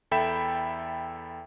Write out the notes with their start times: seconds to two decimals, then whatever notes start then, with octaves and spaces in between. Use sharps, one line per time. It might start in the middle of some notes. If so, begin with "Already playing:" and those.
0.11 E2 A4 E5 G5 B5 E7